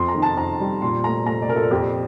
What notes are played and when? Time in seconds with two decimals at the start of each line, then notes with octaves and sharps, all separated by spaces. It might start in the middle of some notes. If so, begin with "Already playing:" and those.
Already playing: F2 C6
0.08 A#5
0.15 D#3
0.22 A5
0.37 F2 A#5
0.60 G3
0.82 A#2 C6
1.04 A3 A#5
1.26 A3 A#5
1.42 D5
1.48 A#2 A#4
1.56 A4
1.71 F2 G4